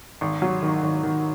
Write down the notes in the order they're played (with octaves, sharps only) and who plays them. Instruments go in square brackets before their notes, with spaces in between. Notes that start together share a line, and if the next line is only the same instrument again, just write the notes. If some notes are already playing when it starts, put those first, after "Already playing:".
[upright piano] G#1
F#3
D#3
G#1
D#3